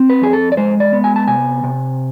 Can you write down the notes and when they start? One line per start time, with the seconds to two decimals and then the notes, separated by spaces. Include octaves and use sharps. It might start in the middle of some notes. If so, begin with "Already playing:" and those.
Already playing: C4
0.10 B4
0.22 F2 G#4
0.33 A4
0.52 D5
0.57 G#3 C5
0.80 D5
0.93 B3
1.04 G#5
1.16 A5
1.28 C3 G#5
1.64 C3